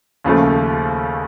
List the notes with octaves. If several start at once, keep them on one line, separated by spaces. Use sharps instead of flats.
D#2 C#3 F3 A3